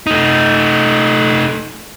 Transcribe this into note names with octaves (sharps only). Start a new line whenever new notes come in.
A3 D#4